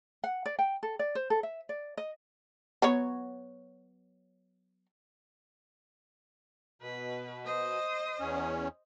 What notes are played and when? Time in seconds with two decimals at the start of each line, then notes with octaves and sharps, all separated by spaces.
0.24 F#5
0.46 D5
0.59 G5
0.83 A4
0.99 D5
1.15 C5
1.30 A4
1.43 E5
1.69 D5
1.97 D#5
2.82 F#3 B3 C#5
6.82 B2 B4
7.45 C5 D#5
8.20 E2 C#4